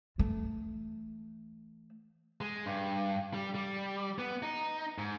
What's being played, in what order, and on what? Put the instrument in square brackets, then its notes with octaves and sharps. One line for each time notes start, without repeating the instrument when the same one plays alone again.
[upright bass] E3 A3
[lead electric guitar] G#3
G2
G3
G3
B3
D#4
G#2